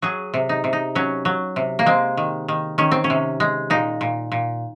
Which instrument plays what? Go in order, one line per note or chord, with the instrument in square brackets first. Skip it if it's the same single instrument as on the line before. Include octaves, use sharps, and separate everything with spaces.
[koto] F#3 G#4
C3
D#4
C3
D#4
F#3 C#4
F#3
C3
A#3
G#3 C4
D#3
D#3
D#3 C#4
C4
C#4
C3
G#3
A#2 D#4
A#2
A#2